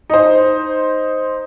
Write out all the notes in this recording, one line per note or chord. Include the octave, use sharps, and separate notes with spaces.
D#4 C5